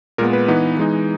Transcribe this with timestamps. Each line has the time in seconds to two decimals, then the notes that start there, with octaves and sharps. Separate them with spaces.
0.18 A#2 G#3 B3 A#4
0.33 B4
0.48 E3 B3 D#4
0.77 E3 G#3 D#4